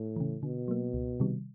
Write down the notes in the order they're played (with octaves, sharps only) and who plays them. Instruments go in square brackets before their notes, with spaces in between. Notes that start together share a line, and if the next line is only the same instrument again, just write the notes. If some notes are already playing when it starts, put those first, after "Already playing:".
Already playing: [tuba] A2
[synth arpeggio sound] C#3 E3
[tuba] B2 [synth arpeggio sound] D3
[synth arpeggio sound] F#3 A#3
C#2
C3 D#3 G3